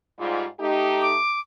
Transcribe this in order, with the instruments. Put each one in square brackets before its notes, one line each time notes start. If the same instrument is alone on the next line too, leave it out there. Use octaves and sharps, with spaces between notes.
[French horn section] G#2 G3 F4
A3 D#4 G4
[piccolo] D6